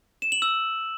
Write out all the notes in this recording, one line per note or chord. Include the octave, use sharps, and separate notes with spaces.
E7
F#7
E6